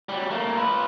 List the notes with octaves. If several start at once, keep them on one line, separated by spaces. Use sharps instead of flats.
F#3 G3
A3 A#3
F4 B4